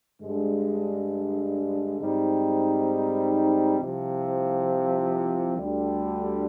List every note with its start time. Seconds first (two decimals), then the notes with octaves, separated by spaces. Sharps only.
0.21 G2 D3 G#3
1.99 G#2 G3 C4 D#4
3.78 C2 C3 F3
5.55 D2 D3 G3